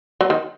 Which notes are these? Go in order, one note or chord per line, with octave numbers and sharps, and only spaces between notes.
F#3
D#3